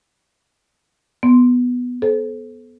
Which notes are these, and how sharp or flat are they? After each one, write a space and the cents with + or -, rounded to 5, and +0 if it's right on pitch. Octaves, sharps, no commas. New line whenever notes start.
B3 +0 C6 +0
A4 -30 C5 +0